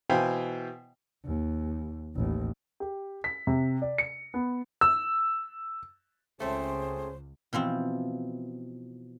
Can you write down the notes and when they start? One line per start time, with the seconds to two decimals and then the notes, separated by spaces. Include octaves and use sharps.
0.10 B2 E3 C5 F5 G5 G#5
1.25 D#2
2.15 A1 D#2
2.80 G4
3.24 B6
3.47 C3
3.82 D5
3.98 C#7
4.34 B3
4.81 E6
6.40 C#2 A3 C4 C#4 G#4 C5
7.53 B2 E3 F3 C4